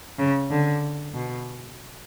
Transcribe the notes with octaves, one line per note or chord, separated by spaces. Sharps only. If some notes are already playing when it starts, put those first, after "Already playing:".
C#3
D3
B2